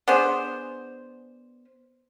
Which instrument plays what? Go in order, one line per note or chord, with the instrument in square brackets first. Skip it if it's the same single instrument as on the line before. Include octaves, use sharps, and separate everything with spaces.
[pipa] B3 D4 G#4 C5